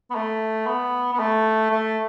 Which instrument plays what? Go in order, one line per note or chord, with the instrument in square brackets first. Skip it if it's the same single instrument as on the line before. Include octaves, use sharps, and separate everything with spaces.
[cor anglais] B3
A3
B3
B3
A3
A3